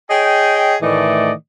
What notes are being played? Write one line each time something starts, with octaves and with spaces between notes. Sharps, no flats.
G#4 C#5 D#5 G5
A2 D#3 E3 A3 D5 D#5